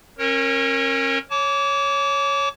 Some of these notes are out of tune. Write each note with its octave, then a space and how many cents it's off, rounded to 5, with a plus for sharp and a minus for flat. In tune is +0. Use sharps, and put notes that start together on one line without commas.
C#4 -35 A#4 +0 C#5 -25
C#5 +0 A5 -20 D6 -30